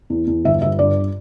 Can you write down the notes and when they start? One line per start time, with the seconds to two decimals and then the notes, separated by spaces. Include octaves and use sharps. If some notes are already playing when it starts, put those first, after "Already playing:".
0.10 E2
0.27 E2
0.45 G1 E5
0.62 G1 E5
0.79 G2 D5